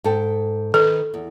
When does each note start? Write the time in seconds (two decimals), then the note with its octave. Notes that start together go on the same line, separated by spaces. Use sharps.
0.04 G#2 A4 G5
0.74 D#3 A4 B4 D#5
1.14 E2